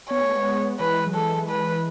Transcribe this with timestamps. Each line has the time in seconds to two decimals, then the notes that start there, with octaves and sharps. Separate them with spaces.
0.10 B3 C#5
0.21 A3
0.31 G#3 B3
0.79 E3 G#3 B4
1.07 F#3
1.14 E3 G#3 A4
1.49 B4